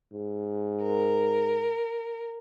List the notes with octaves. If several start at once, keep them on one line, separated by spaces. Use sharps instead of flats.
G#2
A#4